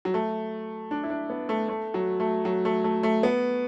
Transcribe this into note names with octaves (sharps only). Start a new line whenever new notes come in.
F#3
A3
D4
E4
D4
B3
A3
A3
F#3
A3
F#3
A3
A3
A3
B3